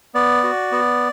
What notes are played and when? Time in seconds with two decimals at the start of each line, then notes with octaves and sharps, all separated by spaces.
0.15 B3 D5
0.44 F#4
0.72 B3